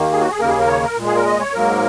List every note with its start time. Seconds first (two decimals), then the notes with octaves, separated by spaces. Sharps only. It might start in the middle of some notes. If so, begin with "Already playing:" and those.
Already playing: D#2 D#3 A#3
0.12 G#4
0.21 F#4
0.30 G#4
0.40 D#2 C#3 A#3 A#4
0.49 G#4
0.59 A#4
0.68 C#5
0.83 A#4
0.96 A#2 G#3
1.06 G#4
1.16 A#4
1.26 D#5
1.40 C#5
1.53 G#2 F#3 A#3 A#4